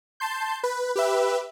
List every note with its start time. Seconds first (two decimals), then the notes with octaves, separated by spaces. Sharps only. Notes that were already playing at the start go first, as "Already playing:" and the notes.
0.20 A5 C6 G6
0.63 B4
0.96 G4 B4 E5